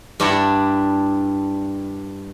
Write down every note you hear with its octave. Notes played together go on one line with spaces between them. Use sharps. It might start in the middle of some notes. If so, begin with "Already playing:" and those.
G2 D4 E4 G4 D5 F#5